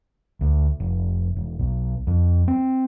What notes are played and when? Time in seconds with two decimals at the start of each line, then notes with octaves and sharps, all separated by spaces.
0.41 D2
0.80 F1
1.37 E1
1.59 B1
2.07 F2
2.48 C4